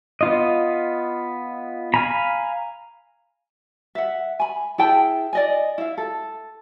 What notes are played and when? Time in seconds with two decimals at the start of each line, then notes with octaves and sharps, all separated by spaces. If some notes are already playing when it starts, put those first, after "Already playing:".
0.21 B3 F4 D#5
1.94 F5 G#5 A#5 B5
3.95 E5 F#5
4.40 G#5 B5
4.78 E4 G#4 G5 A5
5.33 D5 D#5 G#5
5.78 E4 F5
5.98 A4